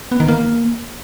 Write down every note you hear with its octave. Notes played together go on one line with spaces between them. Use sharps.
B3
D#3
A#3